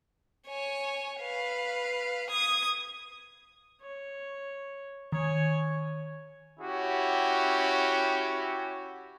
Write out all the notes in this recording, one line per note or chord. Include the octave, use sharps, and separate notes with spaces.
C#5 G#5
B4 F5
D#6 G#6
C#5
D#3 C#5 G#5
C#4 E4 F#4 G4 C#5